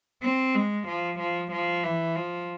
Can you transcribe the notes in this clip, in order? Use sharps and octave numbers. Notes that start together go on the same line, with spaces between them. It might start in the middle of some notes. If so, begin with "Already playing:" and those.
C4
G#3
F3
F3
F3
E3
F3